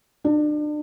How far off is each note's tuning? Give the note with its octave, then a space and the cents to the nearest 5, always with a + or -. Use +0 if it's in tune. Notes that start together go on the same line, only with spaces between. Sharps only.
D4 +35